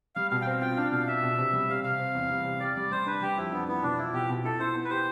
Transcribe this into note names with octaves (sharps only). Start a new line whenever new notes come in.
G3 F5
B2 F5
G5
C4 F5
F4 G5
D4 F5
B2 F5
D4 E5
B2
C3
G3
C3 F5
C3 F5
C4
E2
G3
C3
G4 D5
G3 D5
G3 C5
D4 B4
G3 G4
F2 E4
B3 D4
E3 B3
B2 D4
E4 F4
B2 G4
B2
E4 A4
E4 C5
B3
B4
G4 C5